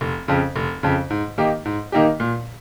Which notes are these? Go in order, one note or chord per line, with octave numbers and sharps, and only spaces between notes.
F1
F2 C#3
F1
F2 C#3
G#2
D#3 A#3 D#4 G4
G#2
D#3 A#3 D#4 G4
A#2